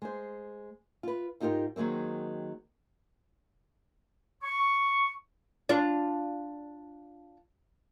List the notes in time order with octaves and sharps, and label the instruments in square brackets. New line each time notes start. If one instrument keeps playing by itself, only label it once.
[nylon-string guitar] G#3 C5
F4 B4
G#2 D#4 F4 G4 A#4
D#3 F#3 G#3 A#3 C4
[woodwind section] C#6
[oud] D4 F4